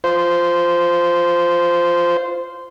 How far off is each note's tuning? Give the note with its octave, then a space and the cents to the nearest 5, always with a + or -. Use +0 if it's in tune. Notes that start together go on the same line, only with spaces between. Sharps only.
F4 +0 C5 -10